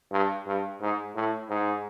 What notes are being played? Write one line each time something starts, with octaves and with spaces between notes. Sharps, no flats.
G2
G2
G#2
A2
G#2